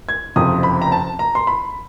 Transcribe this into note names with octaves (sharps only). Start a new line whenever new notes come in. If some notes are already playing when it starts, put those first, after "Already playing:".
G#6
F#1 F2 C3 F3 D#6
B5
A#5
A5
A#5
C6
B5